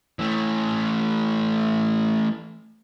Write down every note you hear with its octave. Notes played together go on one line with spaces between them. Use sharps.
E3 A3